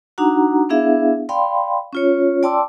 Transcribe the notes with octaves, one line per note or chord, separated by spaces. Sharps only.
D4 D#4 F#4 F#5 A#5
B3 D4 E4 G#4 E5 F5
D5 F5 G5 B5 C6
C#4 F4 C#5
D5 G5 A5 C6 D6 E6